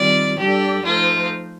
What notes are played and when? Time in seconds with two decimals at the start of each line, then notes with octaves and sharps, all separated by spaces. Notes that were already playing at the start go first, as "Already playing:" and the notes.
Already playing: D#3 G3 C4 F4 D5
0.38 G3 D4 G4 A4 D5
0.84 F3 A3 D#4 F4 A4 C5